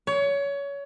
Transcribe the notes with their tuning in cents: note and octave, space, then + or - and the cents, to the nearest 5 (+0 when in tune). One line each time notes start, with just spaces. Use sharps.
C#5 +25